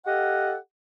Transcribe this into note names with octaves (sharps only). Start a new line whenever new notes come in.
G4 A4 D#5 F5 F#5